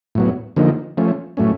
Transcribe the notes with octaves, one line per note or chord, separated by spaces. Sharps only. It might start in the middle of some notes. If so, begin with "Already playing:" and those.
A2 F#3 B3
D3 F3 A#3 D#4
F3 A3 C#4
A2 F#3 A3 C#4